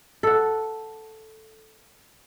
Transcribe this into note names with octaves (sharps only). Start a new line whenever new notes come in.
A4 F#5